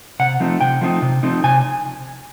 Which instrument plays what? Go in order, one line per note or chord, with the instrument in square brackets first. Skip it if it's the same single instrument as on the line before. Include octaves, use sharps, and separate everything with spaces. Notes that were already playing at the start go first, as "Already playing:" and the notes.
[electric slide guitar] C3 F#5
F3 A3 C4 D#4
C3 G5
F3 A3 C4 D#4
C3
F3 A3 C4 D#4
C3 G#5